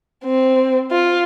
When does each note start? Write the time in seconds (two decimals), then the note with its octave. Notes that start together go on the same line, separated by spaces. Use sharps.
0.24 C4
0.91 F4